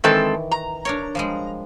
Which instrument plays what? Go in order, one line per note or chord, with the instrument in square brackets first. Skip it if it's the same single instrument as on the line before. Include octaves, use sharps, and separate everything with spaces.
[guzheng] D#3 E3 [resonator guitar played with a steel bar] G#3 C4 A4
[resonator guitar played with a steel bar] A#5
[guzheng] D4 A#4 C#5
F3 G3 G#3